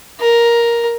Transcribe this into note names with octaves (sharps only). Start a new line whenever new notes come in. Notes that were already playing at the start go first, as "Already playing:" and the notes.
A#4